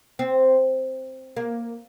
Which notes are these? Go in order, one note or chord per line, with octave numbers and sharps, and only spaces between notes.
C4
A#3